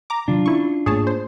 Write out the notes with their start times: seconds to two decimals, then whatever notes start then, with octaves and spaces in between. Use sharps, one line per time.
0.10 A#5 D6
0.28 C3 D#3 F#3 D4 F4
0.46 C#4 E4 C#6
0.86 G#2 A3 A#3 G#4 C#5 A5
1.07 C5